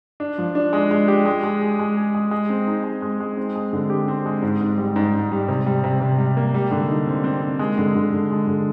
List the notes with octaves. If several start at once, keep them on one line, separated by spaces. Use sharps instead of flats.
D4
F3
D4
G#3
G#3
G4
G#3
G#3
G#4
G#3
G#4
G#3
G#3
C4
D#4
G#3
G#3
G#3
C4
G#3
D3
G4
C4
G#3
G#2
G#2
G3
G#2
G#2
G3
C3
G3
C3
C3
G3
A#3
G3
D3
D#4
C4
C4
C4
G#3
D3
D3
D3
G#3
D3